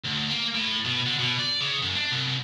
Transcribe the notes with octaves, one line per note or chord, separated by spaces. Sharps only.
D2
A#3
A2
B2
D3
B2
D5
C#3
F#2
D4
C2